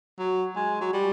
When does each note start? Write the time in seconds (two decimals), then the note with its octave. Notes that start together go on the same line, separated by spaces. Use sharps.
0.19 F#3
0.56 G#3
0.81 F#3
0.93 G3